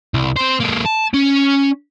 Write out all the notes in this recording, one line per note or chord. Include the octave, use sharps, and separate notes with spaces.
C2
C4 C5
G#3 A#3
A5
C#4